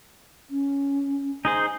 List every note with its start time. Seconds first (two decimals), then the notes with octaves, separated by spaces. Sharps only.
0.50 C#4
1.45 D#4 G#4 C5 G#5